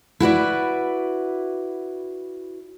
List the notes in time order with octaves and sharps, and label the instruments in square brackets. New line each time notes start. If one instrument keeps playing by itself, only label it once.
[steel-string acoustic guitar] E4 F#4 B4 D5